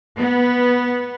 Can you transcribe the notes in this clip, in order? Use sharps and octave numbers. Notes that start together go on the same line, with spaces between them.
B3